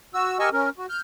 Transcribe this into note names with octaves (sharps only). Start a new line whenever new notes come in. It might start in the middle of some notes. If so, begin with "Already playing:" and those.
F#4 E6
G4 A#4 D#5 G#5 C#6 E6
C#4 A#4
F#4
F6 G6